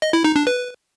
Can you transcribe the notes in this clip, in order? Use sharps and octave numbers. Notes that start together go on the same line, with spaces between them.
D#5
E4
D#4
D4
B4